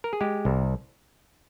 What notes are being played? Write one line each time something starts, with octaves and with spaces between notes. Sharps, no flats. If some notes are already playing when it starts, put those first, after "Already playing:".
A#4
G#4
G#3 G4
C2